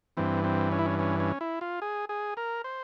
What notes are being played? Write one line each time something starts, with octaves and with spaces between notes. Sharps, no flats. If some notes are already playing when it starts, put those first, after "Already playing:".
G2 E3 C4
C4
C#4
E4
C#4
C#4
C#4
E4
F4
G#4
G#4
A#4
C5